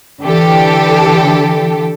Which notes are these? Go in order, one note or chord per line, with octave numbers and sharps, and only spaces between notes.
D3 E3 G4 A4